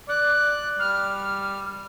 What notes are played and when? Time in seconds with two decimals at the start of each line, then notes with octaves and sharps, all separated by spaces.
0.08 D5 F#6
0.79 G3 F6